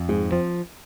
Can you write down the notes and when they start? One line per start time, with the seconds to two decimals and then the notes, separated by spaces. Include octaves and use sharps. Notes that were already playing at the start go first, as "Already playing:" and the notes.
Already playing: F2
0.09 G#2 G#3 G#4
0.31 F3 C4 C5